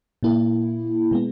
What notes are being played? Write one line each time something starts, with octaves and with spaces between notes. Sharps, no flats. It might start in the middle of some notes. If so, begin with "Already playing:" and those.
A#2 A#3 E4
B2 G#3 B3